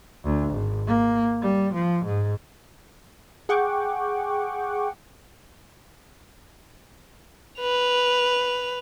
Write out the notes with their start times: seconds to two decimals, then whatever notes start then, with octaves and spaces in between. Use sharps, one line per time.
0.24 D2
0.53 G#1
0.87 A#3
1.42 G3
1.74 F3
2.05 G#2
3.49 G#4 F#5 G5 C#6 D6
7.60 B4 F7